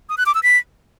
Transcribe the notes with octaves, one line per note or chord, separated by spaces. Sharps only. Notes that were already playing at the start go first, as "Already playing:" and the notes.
D#6
F#6
D6
E6
B6